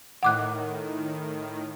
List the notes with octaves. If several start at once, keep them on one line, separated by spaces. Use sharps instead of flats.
A2 D#3 F#5 D6 F#6